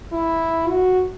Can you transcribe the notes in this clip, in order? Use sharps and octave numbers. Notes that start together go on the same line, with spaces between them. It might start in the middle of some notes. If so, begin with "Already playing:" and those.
E4
F#4